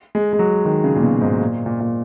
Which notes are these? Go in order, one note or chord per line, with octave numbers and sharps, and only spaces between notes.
G#3
G#3
F#3
D#3
C#3
A#2
B2
G#2
A#2
A#2
A#2